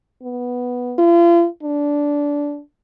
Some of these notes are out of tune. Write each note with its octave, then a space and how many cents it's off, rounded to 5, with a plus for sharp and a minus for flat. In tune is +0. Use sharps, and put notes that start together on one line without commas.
B3 -5
F4 -40
D4 -15